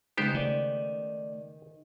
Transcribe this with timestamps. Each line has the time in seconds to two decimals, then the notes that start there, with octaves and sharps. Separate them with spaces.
0.17 C#3 G#3 B3 D#4 G4 C5
0.34 D#3 A3 D5